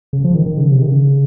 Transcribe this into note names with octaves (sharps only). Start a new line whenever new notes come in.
C#3
F3
D#3
D#3
C#3
C3
D#3
C#3